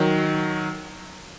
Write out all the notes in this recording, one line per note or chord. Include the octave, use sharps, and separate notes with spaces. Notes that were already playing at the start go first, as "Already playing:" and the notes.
Already playing: D#3 F#3